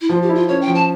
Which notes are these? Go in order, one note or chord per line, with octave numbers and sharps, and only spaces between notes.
E4
F3 F4
G4
E4
F4
C#4 C#5
G5
F3
A5